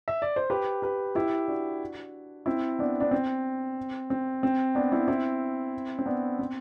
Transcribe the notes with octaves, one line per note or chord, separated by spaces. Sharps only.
E5
D5
C5
G4 B4
G4 B4
E4 G4
D4 F#4
C4 E4
B3 D4
B3 D4
C4
C4
C4
B3 D4
C4 E4
C4 E4
C4
B3 D4
C4